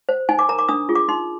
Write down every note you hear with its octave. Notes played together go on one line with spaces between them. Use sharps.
C5
D#4 G#5
D6
A#4 A#5
D6
D4 D#6
F4 G#4
D6
D#4 C6